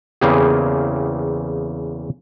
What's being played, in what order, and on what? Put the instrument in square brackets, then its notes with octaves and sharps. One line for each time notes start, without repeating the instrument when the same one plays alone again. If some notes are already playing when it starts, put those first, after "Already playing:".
[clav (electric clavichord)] E2 C#3 A#3 C4 G4 G#4